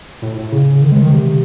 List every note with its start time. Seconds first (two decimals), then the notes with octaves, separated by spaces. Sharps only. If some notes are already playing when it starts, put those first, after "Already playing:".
0.22 A2
0.37 A2
0.52 C#3
0.81 D#3
0.92 G#3
1.02 D#3
1.12 C3